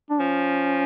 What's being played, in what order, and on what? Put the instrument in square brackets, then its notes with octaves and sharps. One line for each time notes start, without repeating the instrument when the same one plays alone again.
[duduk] D4
[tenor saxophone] F3 [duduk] C#4